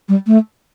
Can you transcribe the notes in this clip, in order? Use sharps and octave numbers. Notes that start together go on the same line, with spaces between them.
G3
A3